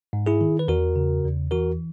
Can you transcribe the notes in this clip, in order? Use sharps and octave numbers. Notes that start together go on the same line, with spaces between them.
G#2
E4 G#4
D#3
B4
E2 F#4 A#4
C#3
E2
E3 F#4 A#4